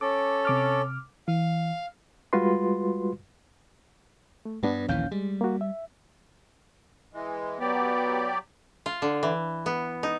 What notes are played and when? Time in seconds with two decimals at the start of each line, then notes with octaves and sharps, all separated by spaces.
0.01 C#4 A4 D6
0.45 C3 D6 F6
1.28 E3 F5
2.33 G3 G#3 F4 F#4 B4 C6
4.45 A3
4.63 G2 G3 B3 D4
4.89 A#1 D#2 E3 C#4 F5 G6
5.11 G3 G#3
5.41 A#3 F#4
5.61 E5
7.14 E3 G#3
7.60 F#3 B3 G4 D5
8.86 F4
9.02 D3
9.23 E3
9.66 B3
10.03 D#4